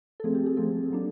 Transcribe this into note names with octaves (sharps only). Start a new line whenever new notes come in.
A4
F3 A3 C4 G#4
G4
G#4
F3 A3 C4 A4
F#3 A#3 D4